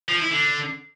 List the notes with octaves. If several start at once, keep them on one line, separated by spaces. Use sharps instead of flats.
F3
E4
D3